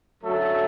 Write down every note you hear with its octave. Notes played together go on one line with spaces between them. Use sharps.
F#2 D3 F#3 A3 A4